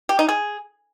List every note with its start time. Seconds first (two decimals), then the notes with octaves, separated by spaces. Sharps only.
0.09 G4
0.19 D#4
0.29 G#4